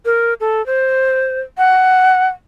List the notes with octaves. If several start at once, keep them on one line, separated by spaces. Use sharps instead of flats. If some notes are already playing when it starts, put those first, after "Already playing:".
A#4
A4
C5
F#5